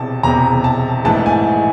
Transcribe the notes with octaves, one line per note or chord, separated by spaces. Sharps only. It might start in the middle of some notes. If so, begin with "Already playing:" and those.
Already playing: E1 E2 C3 A5
E1 E2 C3 A#5
A5
A#1 G#2 E3 A3 A5
G#5